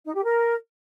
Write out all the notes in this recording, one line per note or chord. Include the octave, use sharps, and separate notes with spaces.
D#4
G4
A#4